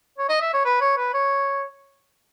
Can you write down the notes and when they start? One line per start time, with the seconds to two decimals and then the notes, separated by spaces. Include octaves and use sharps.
0.18 C#5
0.29 D#5
0.42 E5
0.53 C#5
0.65 B4
0.81 C#5
0.97 B4
1.14 C#5